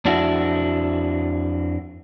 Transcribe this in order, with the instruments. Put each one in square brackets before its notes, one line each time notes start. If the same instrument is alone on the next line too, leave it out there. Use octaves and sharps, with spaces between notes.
[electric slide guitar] F2 D4 E4 F#4